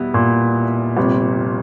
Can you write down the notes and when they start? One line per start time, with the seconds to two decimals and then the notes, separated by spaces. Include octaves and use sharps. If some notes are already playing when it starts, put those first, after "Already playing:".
Already playing: E2 B2 G3 B3 E4
0.14 A#2
0.97 G1 F2 C3